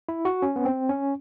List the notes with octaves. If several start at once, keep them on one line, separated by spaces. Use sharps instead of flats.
E4
F#4
C#4
B3
C4
C#4